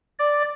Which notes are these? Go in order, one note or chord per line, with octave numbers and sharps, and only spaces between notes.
D5